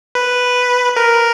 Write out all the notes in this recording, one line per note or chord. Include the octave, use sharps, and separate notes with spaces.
B4
A#4